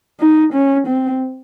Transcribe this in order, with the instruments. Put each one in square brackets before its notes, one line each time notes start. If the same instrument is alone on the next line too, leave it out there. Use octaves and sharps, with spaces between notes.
[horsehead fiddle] D#4
C#4
C4